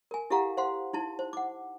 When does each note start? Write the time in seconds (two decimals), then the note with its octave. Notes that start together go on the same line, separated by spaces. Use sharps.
0.11 A#4 G#5
0.30 E4 G4 A4 F5 F#5 A#5
0.57 C5 F5 F#5 C6
0.93 D#4 E4 A5
1.19 C5
1.33 F#5 D6